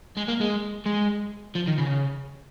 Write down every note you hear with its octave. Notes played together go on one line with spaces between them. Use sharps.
G#3
A#3
G#3
G#3
F3
D#3
C#3